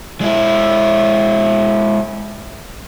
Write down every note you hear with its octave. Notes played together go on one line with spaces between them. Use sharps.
G#3 E4